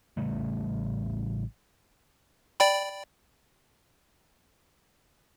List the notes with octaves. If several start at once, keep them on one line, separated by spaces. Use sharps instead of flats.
A1 C#3 G3 A3
D5 G5 B5